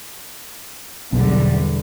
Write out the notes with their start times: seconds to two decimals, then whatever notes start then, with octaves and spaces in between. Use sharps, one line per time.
1.13 B1 E2 D3 G3